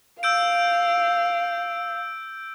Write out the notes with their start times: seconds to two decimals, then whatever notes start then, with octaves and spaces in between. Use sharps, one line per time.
0.23 F5 E6 G6 D7